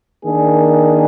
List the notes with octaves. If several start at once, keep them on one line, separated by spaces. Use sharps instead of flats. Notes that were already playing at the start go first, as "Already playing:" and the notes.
D#3 A#3 D4 G#4